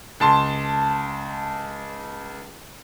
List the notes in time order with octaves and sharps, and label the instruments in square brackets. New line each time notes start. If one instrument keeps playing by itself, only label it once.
[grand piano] C#2 A5 C6